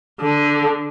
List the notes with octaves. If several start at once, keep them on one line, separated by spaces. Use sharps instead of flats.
D3